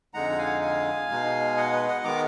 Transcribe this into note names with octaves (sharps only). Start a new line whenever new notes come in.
F2 D3 G#3 D#4 F#5 A#5
F#5
F5 G#5
F5 G#5
B2 G#3 D#4
D#5 F#5
B4 D#5
D#5 F#5
D#3 G#3 B3 A#5 D6